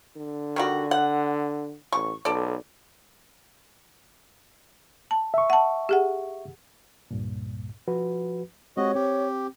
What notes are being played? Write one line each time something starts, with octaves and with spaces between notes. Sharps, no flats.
D3
D#3 G3 F#4
F#5
A1 C#6
B1 A4 D5
A5
E5 C#6
F#5 A5
G4 G#4 F#5
C#2 G2 A#2
F3 F#4 B4
G#3 C4 F#4 G4 C#5 D#5
C4 G4